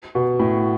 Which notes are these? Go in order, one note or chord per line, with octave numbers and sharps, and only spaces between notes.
B2
A2